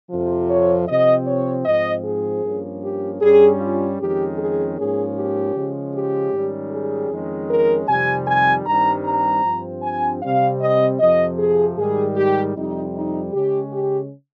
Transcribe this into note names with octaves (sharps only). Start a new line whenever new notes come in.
F2 C3 F3
C#5
C3 F3 C4 D#5
C#5
G#2 F3 C4 D#5
G#4
G2 F3 A#3 C#4
G4
G2 G3 C#4 G#4
F4
F2 D#3 G#3 C#4 G4
G#4
G#2 F3 A#3 C#4 G#4
G4
C#3 F3 G#3 C#4
G4
G#2 D#3 G3 C#4
G#4
F2 D#3 G#3 C#4
A#4
F2 C3 D#3 G3 C4 G#5
G#5
G2 D#3 G3 C4 A#5
A#5
G2 F3 C4
G#5
C3 G3 C4 F5
D#5
F2 C3 F3 D#5
G#4
G#2 D#3 G3 G#4
G4
F2 C3 G3 D#4
D#4
C#3 G#3 C#4 G4
G4